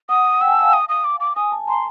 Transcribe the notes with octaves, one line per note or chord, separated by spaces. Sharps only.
F#5 D#6
G5 E6
G#5
A5
F5
D#6
D#6
D6
D6
G#5 D#6
A5
A#5 C6